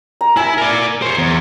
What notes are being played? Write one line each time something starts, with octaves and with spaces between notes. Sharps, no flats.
A#5
E4 G#5
A#4 D5
C5 C#5
E2